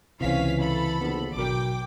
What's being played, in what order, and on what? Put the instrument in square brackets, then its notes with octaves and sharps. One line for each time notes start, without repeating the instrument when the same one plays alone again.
[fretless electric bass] C#2 C3 [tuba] E3 [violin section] C#4 F5 B6
[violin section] A4 B5
[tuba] A#1 [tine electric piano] D#3 B3
[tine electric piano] G#1 B2 A#4 [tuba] F#3 [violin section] G5 D6